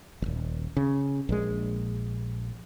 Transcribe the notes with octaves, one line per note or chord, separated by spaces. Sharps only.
D#1 G#1
C#3
A#1 G#3